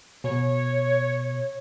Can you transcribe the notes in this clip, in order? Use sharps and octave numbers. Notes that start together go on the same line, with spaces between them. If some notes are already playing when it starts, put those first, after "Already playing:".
B2 C#5